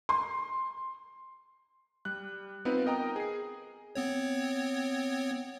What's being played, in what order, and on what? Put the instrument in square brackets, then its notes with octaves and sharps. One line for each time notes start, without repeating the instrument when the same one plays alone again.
[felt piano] C6
[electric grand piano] G3 F#6
B3 C4 D#4 F4 B4
A#4 D#5 G5 A#5 D#6
G#4 C7
[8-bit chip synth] B3 C4 C#5